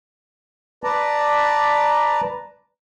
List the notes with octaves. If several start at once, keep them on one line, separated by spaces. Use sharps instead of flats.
B4 D5 A5 A#5